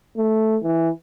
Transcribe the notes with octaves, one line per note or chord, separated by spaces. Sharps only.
A3
E3